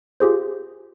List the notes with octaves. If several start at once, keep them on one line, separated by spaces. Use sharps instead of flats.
F4 G4 G#4 C5